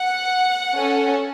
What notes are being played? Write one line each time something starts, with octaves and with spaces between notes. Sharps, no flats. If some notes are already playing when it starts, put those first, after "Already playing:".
Already playing: F#5
C#4 A4